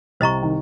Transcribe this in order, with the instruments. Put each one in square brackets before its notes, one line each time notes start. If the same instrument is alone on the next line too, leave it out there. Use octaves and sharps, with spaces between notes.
[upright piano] C2 C3 [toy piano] C5 D#5 A#5 C#6
[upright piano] D#3